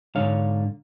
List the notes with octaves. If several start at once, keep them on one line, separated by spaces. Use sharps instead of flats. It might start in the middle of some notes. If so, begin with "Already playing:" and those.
G#2 D3 C#5 F5